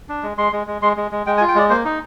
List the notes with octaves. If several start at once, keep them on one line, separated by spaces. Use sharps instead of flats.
D4
G#3
G#3 C6
G#3
G#3
G#3 C6
G#3
G#3
G#3 G5
G#5
F4
G5
G#3 D5
A#3 C5
D#4